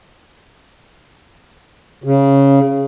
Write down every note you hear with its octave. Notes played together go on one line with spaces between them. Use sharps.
C#3